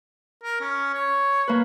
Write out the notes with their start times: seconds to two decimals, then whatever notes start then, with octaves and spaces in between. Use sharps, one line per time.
0.43 A#4
0.61 C#4
0.94 C#5
1.48 A#3 B4